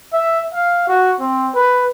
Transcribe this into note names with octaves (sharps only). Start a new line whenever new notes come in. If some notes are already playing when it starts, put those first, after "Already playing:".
E5
F5
F#4
C4
B4